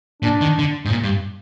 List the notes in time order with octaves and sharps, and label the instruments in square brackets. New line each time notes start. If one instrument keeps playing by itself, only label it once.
[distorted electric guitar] A#2 [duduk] D4
[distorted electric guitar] D#3
D3
G#2
A#2
G2